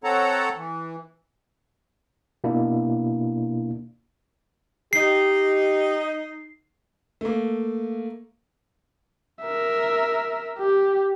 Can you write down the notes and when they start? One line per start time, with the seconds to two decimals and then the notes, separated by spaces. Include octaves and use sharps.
0.04 C4 A4 C#5 F#5 A5 A#5
0.56 E3
2.44 B2 A#3 D4 E4
4.93 D#4 G4 C7
7.21 A3 A#3
9.42 A#4 E5
10.59 G4